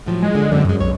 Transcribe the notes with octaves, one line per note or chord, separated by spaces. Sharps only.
A2 F3 F#3
G#3
D3
F#2 D3 C4
F#2 D3 G#3
B1 C#5